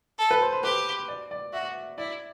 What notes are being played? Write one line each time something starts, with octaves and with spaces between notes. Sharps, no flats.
A4
B4
C5
C5
G4 B4
D5
D5
F#4 E5
E4 D5